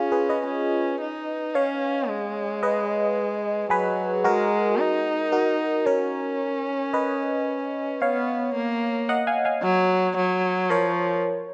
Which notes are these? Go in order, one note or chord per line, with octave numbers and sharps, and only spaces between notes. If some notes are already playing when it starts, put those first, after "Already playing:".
Already playing: C#4 F4 G#4
G#4 B4
B4 D#5
C#4
D#4
C#4 C#5 F5
G#3
B4 D#5
F#3 G#4 B4
G#3 F#4 A#4
D#4
F#4 A#4
C#4 A#4 C#5
B4 D#5
B3 C#5 F5
A#3
D#5 F#5
F5 G#5
F5 G#5
F#3
F#3
F3 A#4 C#5